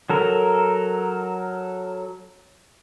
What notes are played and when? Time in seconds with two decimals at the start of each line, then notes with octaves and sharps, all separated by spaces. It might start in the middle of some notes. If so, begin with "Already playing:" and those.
0.10 F#3 A4 A#4